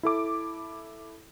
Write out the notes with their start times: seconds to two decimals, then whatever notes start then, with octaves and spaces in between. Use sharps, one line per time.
0.03 E4 A4 D6